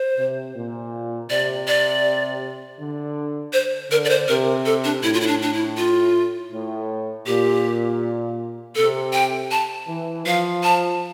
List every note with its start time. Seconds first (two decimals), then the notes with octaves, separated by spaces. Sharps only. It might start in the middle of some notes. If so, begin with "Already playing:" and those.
Already playing: C5
0.17 C3
0.55 A#2
1.29 C3 D5
1.67 D5
2.79 D3
3.53 C5
3.90 D3 A#4
4.05 D5
4.10 C5
4.28 C3 A#4
4.66 A4
4.84 D4
5.03 A2 E4
5.14 F4
5.21 E4
5.27 D4
5.42 D4
5.53 E4
5.77 F4
6.52 A2
7.26 A#2 G4
8.76 C3 A4
9.13 G5
9.51 A5
9.88 E3
10.26 F3 F5
10.63 A5